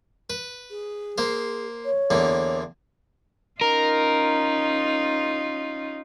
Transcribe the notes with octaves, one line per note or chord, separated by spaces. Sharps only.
B4
G#4
A#3 C5
C#5
E2 D3 A#3
C#4 D#4 F4 A#4